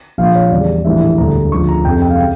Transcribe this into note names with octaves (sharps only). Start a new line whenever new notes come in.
A#1 A#2 F3 F5
C#5
E2 C#3 G3 D5
A#1 A2 E3 G3 E5
E1 D2 D3 G3 A#5
D2 C#3 F3 C#6
A#5
F1 F2 C#3 G5
G5
F5
C#3 G5